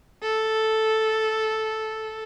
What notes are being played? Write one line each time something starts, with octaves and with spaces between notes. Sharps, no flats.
A4